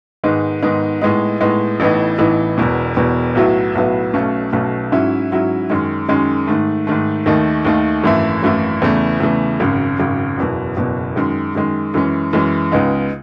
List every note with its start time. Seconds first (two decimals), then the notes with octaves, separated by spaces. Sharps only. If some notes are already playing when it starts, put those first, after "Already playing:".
0.24 G#2 D#3 G#3 B3 D#4
0.63 G#2 D#3 G#3 B3 D#4
1.02 A2 G#3 B3 D#4
1.41 A2 G#3 B3 D#4
1.80 A1 A2 E3 B3 D#4
2.18 A1 A2 E3 B3 D#4
2.58 E1 E2 B2
2.97 E1 E2 B2
3.35 B1 A2 F#3 B3 E4
3.75 B1 A2 F#3 B3 E4
4.14 B1 B2 A3 C#4
4.53 B1 B2 A3 C#4
4.92 G#2 F#3 C#4 E4
5.31 G#2 F#3 C#4 E4
5.70 F#2 D#3 G#3 C#4
6.08 F#2 D#3 G#3 C#4
6.47 G#2 D#3 A3
6.87 G#2 D#3 A3
7.26 D#2 D#3 A3 D#4
7.65 D#2 D#3 A3 D#4
8.04 G#1 F#2 E3 A3 E4
8.43 G#1 F#2 E3 A3 E4
8.82 E2 C#3 E3 A3
9.20 E2 C#3 E3 A3
9.60 G#1 F#2 C#3
9.99 G#1 F#2 C#3
10.38 F#1 E2 B2
10.77 F#1 E2 B2
11.16 F#2 D#3 G#3
11.55 F#2 D#3 G#3
11.94 F#2 E3 G#3 C#4
12.33 F#2 E3 G#3 C#4
12.72 C#2 C#3 G#3 B3 D#4